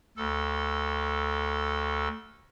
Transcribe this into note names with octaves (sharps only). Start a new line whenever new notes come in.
D2 A4